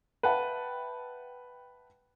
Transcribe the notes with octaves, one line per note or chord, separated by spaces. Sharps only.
B4 E5 F#5 G5 A5